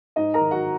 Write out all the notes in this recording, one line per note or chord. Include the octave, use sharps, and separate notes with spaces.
G#2 D#4 D#5
A#4 A#5
D#3
F#4 F#5